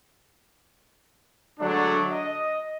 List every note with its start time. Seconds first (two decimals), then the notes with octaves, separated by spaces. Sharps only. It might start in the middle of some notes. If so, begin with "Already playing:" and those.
1.60 D3 F#3 G#3 A3 D4
2.11 D#5